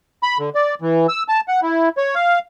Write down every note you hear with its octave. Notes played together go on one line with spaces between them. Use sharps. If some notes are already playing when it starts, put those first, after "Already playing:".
B5
D3
D5
E3
E6
A5
F#5
E4
C#5
F5